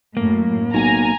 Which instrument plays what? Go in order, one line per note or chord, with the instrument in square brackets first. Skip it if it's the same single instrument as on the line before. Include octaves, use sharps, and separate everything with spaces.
[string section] F#2 A2 [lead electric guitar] A#3
[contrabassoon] B1 [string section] G#5 A#5